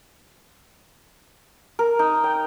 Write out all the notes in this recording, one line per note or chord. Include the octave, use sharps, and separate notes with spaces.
A#4
D#4
G5